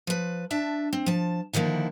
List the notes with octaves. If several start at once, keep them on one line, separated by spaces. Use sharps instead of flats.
F3 B4
D4 E5 A5
C4
F3 A5
D3 D#3 F3 A#3 E4